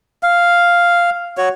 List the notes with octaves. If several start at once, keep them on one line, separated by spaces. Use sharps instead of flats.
F5
F#4 C#5